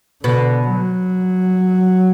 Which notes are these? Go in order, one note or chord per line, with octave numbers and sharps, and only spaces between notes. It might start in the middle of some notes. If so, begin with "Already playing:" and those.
B2 D3
F#3